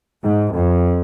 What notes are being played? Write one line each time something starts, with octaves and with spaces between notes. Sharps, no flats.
G#2
F2